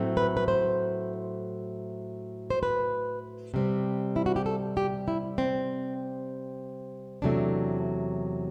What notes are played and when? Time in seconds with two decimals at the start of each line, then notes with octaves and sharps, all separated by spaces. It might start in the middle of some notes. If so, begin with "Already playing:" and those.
Already playing: A2 F#3 A3 C4
0.17 B4
0.37 B4
0.48 C5
2.50 C5
2.63 B4
3.54 C3 G3 C4
4.16 E4
4.26 F#4
4.36 G4
4.46 A4
4.77 G4
5.08 E4
5.38 C4
7.22 E2 C3 F#3 A3 D4